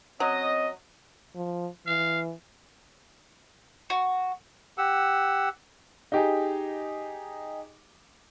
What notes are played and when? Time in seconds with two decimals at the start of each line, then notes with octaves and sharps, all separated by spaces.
0.20 F#3 C4 C#4 D#5
1.35 F3
1.86 E3 F5
3.90 F#4
4.78 G4 F#5 E6
6.12 D#4 G4 G#4